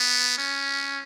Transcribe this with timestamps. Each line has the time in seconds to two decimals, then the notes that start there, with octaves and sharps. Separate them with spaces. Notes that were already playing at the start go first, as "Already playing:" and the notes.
Already playing: B3
0.38 C#4